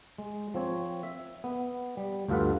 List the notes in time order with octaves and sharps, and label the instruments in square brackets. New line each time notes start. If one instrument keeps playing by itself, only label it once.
[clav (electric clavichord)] G#3
F3 C4 C#5
E5
B3
G3
D2 G2 F4 A4 B4 F#5